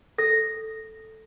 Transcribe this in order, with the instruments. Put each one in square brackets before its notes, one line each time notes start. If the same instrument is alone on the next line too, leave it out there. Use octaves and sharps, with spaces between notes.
[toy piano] A4 [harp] A#6